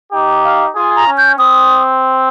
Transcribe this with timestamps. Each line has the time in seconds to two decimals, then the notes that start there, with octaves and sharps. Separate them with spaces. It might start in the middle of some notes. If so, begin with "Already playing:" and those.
0.13 D#4 G4
0.44 F5
0.75 F4 G#4 G#5
0.96 A#5
1.07 C#4
1.18 G6
1.39 C4 D#6